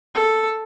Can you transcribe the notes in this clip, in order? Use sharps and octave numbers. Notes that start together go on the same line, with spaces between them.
A4